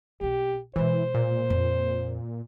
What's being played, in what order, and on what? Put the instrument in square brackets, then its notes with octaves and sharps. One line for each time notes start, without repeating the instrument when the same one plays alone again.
[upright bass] B1 C4 [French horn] G4
[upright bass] B2 G#3 [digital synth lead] E3 [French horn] C5
[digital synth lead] A#2
[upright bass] F2